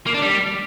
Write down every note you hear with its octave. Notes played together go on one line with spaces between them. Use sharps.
A#3
D4
G3